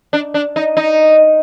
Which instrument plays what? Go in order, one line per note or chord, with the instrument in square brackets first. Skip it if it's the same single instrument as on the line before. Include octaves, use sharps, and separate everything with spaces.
[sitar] D4
D4
D#4
D#4